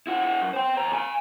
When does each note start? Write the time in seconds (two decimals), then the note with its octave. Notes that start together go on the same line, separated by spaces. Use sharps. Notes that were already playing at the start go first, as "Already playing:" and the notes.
0.07 E4 F#4
0.23 E4 F#4
0.42 F#2
0.53 C5 G5
0.77 D#2 A#5
0.93 F5 G#5